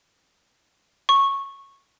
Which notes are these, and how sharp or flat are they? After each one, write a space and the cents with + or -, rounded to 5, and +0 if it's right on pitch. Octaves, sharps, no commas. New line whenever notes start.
C#6 -10